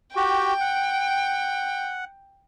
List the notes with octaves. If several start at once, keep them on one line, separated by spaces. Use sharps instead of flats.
F#4 G4 G5
F#5